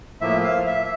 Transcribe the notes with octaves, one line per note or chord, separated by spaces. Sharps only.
A2 F3 A#3 E5
F5
E5